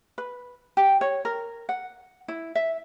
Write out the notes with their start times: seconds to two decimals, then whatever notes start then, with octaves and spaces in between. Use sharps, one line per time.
0.18 B4
0.77 G4
1.01 C#5
1.25 A#4
1.69 F#5
2.28 E4
2.55 E5